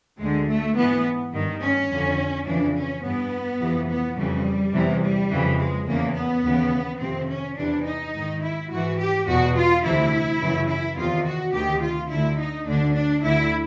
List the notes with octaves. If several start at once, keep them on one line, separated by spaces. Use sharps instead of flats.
D2 D3 G#3
A3
G#2 E3 B3
G2 D#3
C#4
F2 D3
F2 C#3 E3 D4
C#4
G2 E3 B3
F2 C3 E3
B3
F2 C#3 E3 G3
E2 C3 E3
G3
F2 C#3 E3
G#3
E2 C#3 E3 A#3
B3
D#2 C#3 E3
F2 C3 D#3 C4
C#4
E2 C3 E3 D4
D#4
G#2 D#3
E4
G#2 E3 F#4
G4
E2 B2 F#4
F4
D2 C3 E3 E4
F#2 C#3 E3
E4
E2 C3 D#3 F4
F#4
D2 C3 D#3 G4
F4
D2 D3 E4
D#4
D2 D3 D4
D4
D2 D3 E4